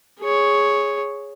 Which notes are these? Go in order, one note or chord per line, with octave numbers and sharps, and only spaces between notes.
G#4 C#5